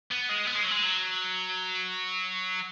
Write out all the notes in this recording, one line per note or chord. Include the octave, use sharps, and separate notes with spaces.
B3
G#3
B3
G#3
F#3
G#3
F#3